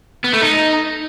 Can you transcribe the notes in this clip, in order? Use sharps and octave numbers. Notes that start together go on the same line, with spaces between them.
B3
A3
D#4